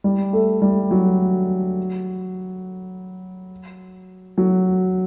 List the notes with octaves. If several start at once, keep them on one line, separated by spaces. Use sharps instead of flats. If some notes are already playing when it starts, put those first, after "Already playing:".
G3
A3
G3
F#3
F#3